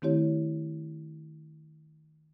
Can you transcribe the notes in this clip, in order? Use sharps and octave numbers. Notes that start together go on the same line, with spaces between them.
D#3 A3 C4 E4 G4 C#5